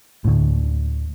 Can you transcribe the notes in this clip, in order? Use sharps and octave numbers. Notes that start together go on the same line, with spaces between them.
D2 A2